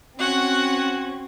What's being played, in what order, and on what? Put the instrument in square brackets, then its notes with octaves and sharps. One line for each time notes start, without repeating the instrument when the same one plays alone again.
[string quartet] C4 [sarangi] C#4 [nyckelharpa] F#4 [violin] F#5